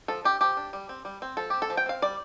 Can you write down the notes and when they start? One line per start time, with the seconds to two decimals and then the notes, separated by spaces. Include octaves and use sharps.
0.08 F3 A4
0.24 D4 G4
0.41 F3 G4
0.57 D4
0.73 G3
0.89 C4
1.05 G3
1.22 C4
1.37 F3 A4
1.50 C4 G4
1.62 A4
1.70 F3
1.77 G5
1.86 C4 F5
2.02 G3 D5